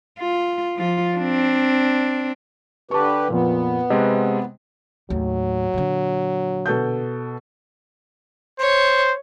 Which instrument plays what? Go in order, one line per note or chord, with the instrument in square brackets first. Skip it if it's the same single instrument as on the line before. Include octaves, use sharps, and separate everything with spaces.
[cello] F4
F3 F4
C4 D4
[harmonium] D3 G4 B4 [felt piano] A5 C#6
[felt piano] F2 A#2 [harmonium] B3
[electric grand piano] C3 G#3 [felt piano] C5 D#5
[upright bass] D#2 A2 [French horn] F#3
[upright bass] A#2 D3
[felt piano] B2 A4 G6
[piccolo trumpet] C5 [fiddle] C#5